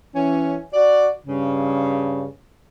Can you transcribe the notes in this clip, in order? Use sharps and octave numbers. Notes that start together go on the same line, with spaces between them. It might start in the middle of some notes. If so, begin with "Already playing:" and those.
E3 C#4
F#4 D5
G2 C#3